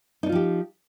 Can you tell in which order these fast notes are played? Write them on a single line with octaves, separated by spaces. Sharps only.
D#4 D4 F4 F3 G4